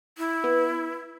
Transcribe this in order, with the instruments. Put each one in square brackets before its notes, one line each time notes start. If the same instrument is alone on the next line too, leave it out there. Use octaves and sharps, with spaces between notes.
[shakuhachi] E4
[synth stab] B3